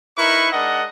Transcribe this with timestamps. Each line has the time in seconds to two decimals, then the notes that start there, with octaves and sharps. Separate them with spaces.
0.18 D#4 E4 A#4 B4 E5 C#6
0.52 G#3 D4 A#4 D#5 F#5